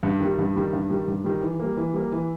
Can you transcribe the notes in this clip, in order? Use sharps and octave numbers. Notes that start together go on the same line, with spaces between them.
G2
D#3 G3
G2
D#3 G3
G2
D#3 G3
G2
D#3 G3
E3
G3 A#3
E3
G3 A#3
E3